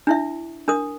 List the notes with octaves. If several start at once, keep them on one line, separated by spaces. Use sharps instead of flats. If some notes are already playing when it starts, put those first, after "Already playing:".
D4 E4 E5
D4 A#4 D#6